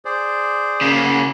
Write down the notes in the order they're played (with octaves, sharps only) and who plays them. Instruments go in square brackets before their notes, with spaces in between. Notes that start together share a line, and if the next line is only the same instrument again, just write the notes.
[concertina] G#4 C5 D5
[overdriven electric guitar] C#3 A#3